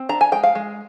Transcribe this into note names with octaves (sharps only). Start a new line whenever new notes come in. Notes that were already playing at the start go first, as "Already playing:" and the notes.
Already playing: C4
D4 A#5
G#5
G#3 G5
F5
G#3